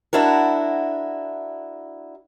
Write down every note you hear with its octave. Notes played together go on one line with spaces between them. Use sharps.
D4 E4 F#4 A#4